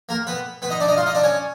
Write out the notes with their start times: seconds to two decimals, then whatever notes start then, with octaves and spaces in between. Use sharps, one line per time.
0.09 A#3 A#4
0.27 B3 B4
0.62 B3 B4
0.70 D#4 D#5
0.80 D4 D5
0.88 D#4 D#5
0.97 F4 F5
1.06 D#4 D#5
1.15 D4 D5
1.23 C#4 C#5